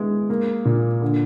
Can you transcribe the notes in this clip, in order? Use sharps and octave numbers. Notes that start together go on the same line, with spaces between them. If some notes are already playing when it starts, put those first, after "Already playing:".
Already playing: G#3 B3 E4
A#3
A#2
D3